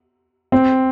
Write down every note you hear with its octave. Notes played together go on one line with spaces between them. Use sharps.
C4